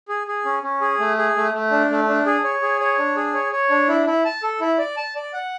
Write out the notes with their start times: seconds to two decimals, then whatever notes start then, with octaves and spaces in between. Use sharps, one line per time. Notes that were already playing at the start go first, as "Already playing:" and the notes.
0.08 G#4
0.27 G#4
0.45 C#4
0.63 C#4
0.81 G#4
0.99 A3
1.18 G#4
1.36 A3
1.54 A3
1.71 D4
1.90 A3
2.08 D4
2.26 G#4
2.44 C#5
2.62 G#4
2.81 C#5
2.98 D4
3.16 G#4
3.34 C#5
3.52 C#5
3.70 D4
3.88 E4
4.06 E4
4.25 A5
4.43 A4
4.61 E4
4.78 D5
4.97 A5
5.16 D5
5.33 F#5